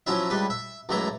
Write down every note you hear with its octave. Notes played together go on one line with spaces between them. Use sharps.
F3 F#3 C#4 E4 E5
C#2 G3 B4
E5
C#2 F#2 E3 A3 E5 A#5